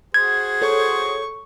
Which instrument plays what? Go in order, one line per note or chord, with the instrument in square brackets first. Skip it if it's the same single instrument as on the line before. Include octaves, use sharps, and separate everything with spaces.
[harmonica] F#4 G#4 C5 [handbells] G#6
[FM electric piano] A4 C#5 G6 [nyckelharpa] C#6